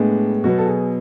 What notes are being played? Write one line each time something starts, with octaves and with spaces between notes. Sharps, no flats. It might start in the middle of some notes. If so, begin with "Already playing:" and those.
Already playing: A2 G#3 B3 D4
B2 F#3 B3 F#4
A4
G#4